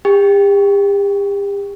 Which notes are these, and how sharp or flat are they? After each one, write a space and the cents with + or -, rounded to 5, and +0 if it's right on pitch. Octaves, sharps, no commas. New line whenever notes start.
G4 +40 G5 +0